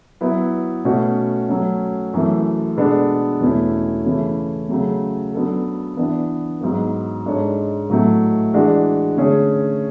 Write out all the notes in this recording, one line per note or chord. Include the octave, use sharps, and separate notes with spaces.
F#3 B3 E4 B4
B2 A3 C#4 F#4 B4
F#3 A3 C#4
F#2 E3 A3
B2 G#3 B3 D4 A4
E2 B2 A3 C#4 E4
C#3 E3 A3 C#4 E4
C#3 F#3 A3
F#3 B3 D4 A4
E3 B3 D4
G#2 F#3 B3
G#2 G#3 D4 A4 C#5
A2 F#3 A3
E3 G#3 D4 F#4
D3 A3 C#4 G#4 C#5